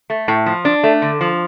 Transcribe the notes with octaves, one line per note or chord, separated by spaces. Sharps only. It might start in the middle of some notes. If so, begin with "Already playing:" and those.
A3
A2
F3
D4
A3
D3
F3